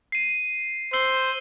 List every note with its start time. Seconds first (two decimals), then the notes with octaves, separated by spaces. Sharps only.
0.12 C7 D#7
0.93 C5 E6 C7 G7